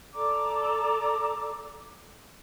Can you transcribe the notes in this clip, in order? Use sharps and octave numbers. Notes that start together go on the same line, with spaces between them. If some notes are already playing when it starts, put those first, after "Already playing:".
A4 D5 A#5 D6